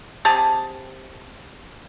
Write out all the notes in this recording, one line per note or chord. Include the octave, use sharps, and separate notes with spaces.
C3 G4 G#4 A5